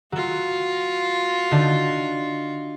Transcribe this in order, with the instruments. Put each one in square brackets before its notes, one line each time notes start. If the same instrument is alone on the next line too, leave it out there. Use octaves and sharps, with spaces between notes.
[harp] F#3 [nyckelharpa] F4 F#4
[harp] D3 D#4 A5